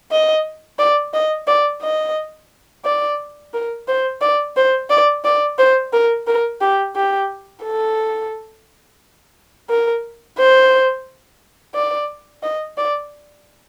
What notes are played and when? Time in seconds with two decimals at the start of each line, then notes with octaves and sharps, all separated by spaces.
0.11 D#5
0.79 D5
1.14 D#5
1.47 D5
1.82 D#5
2.85 D5
3.54 A#4
3.88 C5
4.21 D5
4.57 C5
4.90 D5
5.24 D5
5.58 C5
5.93 A#4
6.27 A#4
6.61 G4
6.96 G4
7.64 A4
9.69 A#4
10.38 C5
11.75 D5
12.43 D#5
12.77 D5